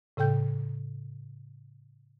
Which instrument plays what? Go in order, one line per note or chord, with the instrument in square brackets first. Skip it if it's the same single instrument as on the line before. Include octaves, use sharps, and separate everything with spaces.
[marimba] A2 C#3 A4 G5 G6